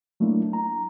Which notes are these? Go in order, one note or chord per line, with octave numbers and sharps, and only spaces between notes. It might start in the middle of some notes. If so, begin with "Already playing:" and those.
F#3 A3 A#3 D4 E4
A#5